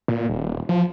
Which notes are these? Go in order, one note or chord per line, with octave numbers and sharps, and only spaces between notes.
A#2
D#1
F3